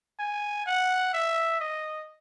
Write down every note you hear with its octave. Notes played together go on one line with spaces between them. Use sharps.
G#5
F#5
E5
D#5